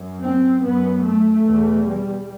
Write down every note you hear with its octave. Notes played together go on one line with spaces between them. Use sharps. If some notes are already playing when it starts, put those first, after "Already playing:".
Already playing: F#2
C4
F#2 B3
A3
E2 B2
G3